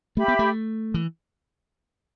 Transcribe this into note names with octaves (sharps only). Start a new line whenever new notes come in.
A3 G4 E5 B5
B3
A3
E3